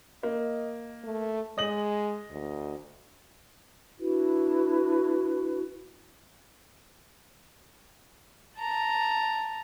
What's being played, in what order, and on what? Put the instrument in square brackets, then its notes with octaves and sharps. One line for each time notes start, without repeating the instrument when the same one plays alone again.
[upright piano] A#3 [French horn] D#5
[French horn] A3
[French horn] G#3 [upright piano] D#5 F#7
[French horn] D2
[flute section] D4 E4 F#4 B4
[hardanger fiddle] A5 A#5